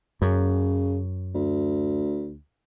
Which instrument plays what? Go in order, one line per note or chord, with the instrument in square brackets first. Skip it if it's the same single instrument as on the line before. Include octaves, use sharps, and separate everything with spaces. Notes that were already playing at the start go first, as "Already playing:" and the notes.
[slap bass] F#2 [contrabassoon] C#3
[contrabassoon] D2